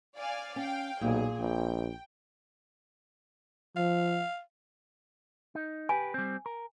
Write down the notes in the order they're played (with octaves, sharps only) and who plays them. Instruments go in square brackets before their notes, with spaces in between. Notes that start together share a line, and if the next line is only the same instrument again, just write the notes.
[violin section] D5 F5 G#5
[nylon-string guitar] C#4 [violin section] F5 G5
[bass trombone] B1 [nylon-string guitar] A#2 [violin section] G#4
[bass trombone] A#1 [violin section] G5
[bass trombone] F3 [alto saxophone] F5
[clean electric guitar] D#4
[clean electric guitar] G4 B4 [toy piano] G#5
[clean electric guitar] G3 C4
A#4